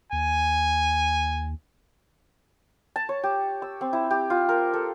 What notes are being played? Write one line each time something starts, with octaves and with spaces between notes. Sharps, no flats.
D#2 G#5
A5
C#5
G4
E6
C4
E4
G4
F4
A#4
A4